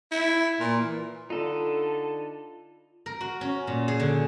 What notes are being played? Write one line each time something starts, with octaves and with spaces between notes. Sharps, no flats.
E4
A#2
E3
D3 D#4 F4 A4
A#4
F#4
C#4
A#2
G#4
D3